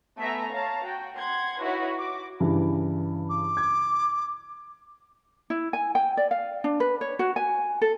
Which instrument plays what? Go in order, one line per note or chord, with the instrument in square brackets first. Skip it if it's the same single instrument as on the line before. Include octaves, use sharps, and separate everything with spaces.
[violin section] A3 B3 E5 G#5 A#5
C#5 F5 A5 A#5
F#4 G5
F#5 C6 G#6
D#4 E4 F#4 B4 C#5
F#4 D6
[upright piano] G2 C#3 E3
[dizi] D6
[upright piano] G#6
[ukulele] E4
G#5
G5
D5
F5
D4
B4
C#5
F#4
G#5
A4